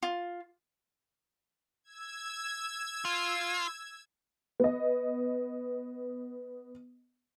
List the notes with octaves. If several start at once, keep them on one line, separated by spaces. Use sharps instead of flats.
F4
E6 G#6
F4
B3 D#5